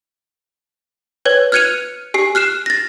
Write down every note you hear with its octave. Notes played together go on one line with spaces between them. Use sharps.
B4 C#5 G#6
F6 F#6 G#6 C#7 D#7 F7
G4 G#5 C7
F6 F#6 C7 E7
A6 A#6